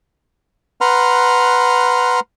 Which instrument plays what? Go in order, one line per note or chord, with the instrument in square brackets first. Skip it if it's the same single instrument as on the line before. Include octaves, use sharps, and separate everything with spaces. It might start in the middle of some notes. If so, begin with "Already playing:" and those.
[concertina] B4 F#5 A#5 C6 F6